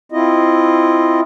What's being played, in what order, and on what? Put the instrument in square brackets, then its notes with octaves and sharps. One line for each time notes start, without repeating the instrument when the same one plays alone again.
[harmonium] C4 E4 F4 D#5